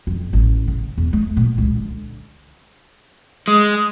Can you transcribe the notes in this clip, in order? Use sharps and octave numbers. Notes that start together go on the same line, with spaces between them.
F2
A1
C#3
E2
A3
A#2
C#2
D3
G#3